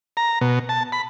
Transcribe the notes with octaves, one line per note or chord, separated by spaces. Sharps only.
A#5
B2
A5
B5